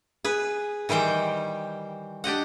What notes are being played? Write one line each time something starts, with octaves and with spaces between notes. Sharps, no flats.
G#4 B4
D#3 E3 G3 C5 G5
D4 G4 D#5 F#5